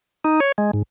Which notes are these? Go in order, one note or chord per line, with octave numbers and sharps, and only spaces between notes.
D#4
C#5
G#3
G#2